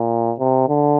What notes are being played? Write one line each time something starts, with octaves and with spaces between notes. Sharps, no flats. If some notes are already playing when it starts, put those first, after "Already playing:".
Already playing: A#2
C3
D3